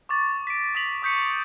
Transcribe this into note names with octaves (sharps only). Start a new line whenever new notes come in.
C#6 D6 A6
B6 D7
D6 D#6 B6 F7 F#7
C#6 D#6 G6 B6 C#7